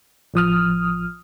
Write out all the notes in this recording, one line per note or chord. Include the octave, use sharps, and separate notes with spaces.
A1 F3 D#6 F6